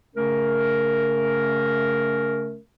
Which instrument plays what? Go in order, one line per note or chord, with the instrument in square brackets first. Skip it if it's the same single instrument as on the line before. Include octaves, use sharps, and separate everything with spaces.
[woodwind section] C#3 A3 C#4 A#4